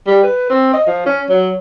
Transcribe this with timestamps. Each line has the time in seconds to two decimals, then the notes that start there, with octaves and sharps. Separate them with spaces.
0.07 G3
0.23 B4
0.50 C4
0.74 D#5
0.87 F3
1.06 C#4
1.30 F#3